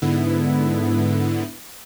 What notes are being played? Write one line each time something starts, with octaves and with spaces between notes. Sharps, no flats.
G#2 D3 B3 E4